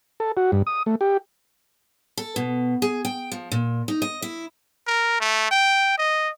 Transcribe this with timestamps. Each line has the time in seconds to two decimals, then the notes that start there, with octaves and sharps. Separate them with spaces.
0.20 A4
0.37 F#4
0.52 G2
0.67 D#6
0.86 A3
1.01 G4
2.17 A4
2.36 B2
2.82 G#4
3.05 G5
3.32 F3
3.52 A#2
3.88 D#4
4.02 D#5
4.22 E4
4.87 A#4
5.21 A3
5.51 G5
5.98 D#5